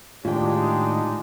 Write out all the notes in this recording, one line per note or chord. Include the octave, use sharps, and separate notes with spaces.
A2 D#3 G#3 D4 D#4 F4 G4 G5